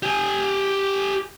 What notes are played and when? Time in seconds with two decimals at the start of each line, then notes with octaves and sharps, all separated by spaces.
0.03 G4 G#5